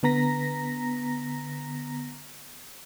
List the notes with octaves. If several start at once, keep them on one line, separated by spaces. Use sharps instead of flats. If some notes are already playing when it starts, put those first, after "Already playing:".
D3 B3 A#5 A#6 B6